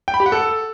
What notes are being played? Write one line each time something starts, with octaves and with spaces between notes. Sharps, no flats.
G5
B5
G4
F#5
A4